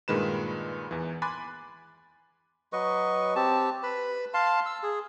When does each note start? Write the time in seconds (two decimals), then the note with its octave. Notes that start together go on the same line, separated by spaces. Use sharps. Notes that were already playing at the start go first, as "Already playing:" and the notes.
0.08 G2 A#2 D#3 G#3 B4 E7
0.91 E2 E3
1.22 G#5 B5 C6 D6 F#6 A6
2.73 F#3 B4 D#5 C#6
3.36 C4 G4 A5
3.83 B4 B5
4.34 F5 A5 C6
4.66 E6
4.83 G#4